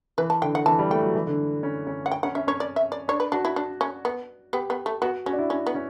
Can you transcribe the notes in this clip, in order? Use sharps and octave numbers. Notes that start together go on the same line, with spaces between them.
E3 B4
A5
D3 G5
F#5
E3 A5
G3
A3 G5
F#3
E3
D3
C#4
C#4
F#5
G5
C#4 F#5
C#4 E5
C#4 C#5
D5
E5
D5
D4 C#5
B4
D4 F#4
E4
D4
C#4
B3
B3 G4
B3
A3
B3 F#4
C#4 F#4
D4
E4
C#4
B3
C#4